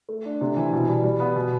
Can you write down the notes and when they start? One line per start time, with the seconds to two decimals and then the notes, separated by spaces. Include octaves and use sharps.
0.09 A3
0.25 D4
0.41 C3
0.56 E3
0.73 B2
0.88 G3
1.04 G3
1.20 B3
1.36 B2